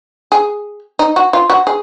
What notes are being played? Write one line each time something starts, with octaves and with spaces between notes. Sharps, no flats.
G#4
D#4
F#4
F4
F#4
G#4